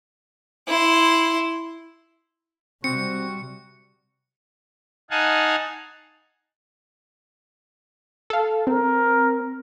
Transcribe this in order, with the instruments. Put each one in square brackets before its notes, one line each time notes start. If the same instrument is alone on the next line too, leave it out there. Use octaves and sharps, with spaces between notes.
[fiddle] E4 C6
[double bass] C3 G3 [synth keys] C4 [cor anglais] F#4 [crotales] C#7
[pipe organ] D#4 F5 F#5 G#5 A5
[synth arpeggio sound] A4 F5
[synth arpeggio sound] C4 [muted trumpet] A#4